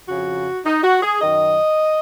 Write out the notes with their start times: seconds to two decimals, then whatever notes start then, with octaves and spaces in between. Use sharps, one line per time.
0.08 F2 C#3 F3 F#4
0.65 D#4
0.83 F#4
1.02 G#4
1.21 F#2 D#3 D#5